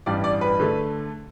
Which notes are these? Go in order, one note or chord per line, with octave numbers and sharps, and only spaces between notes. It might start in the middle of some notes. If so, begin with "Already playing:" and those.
A1 G2 E3 G3 D5
D5
B4
D3 A3